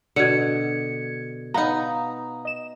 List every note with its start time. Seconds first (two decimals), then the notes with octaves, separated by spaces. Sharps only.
0.16 B2 D3 G#6 C#7
1.54 B3 D#4 F5 A#5
2.45 D#5 E7